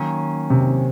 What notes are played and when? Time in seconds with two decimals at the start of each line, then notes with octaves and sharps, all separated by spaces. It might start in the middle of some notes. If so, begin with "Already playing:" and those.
Already playing: D#3 F#3 A#3 C#4
0.50 C3